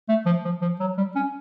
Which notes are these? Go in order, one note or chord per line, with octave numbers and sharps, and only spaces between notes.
A3
F3
F3
F3
F#3
G3
C#4